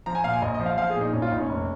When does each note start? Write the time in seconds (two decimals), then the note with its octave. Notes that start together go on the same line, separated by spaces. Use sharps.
0.06 F3 A#5
0.15 G#5
0.24 A#2 F5
0.33 G#5
0.42 A#1 D#5
0.54 D#5
0.60 F3
0.66 F5
0.78 F3 F5
0.90 G#4
0.96 A#2 D#4
1.13 A#1 C#4
1.22 F4
1.31 A#1 D#4
1.40 C#4
1.49 F1